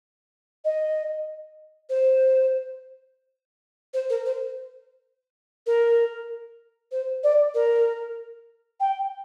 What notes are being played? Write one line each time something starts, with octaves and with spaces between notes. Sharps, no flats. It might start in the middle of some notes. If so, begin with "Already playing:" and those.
D#5
C5
C5
A#4
C5
A#4
C5
D5
A#4
G5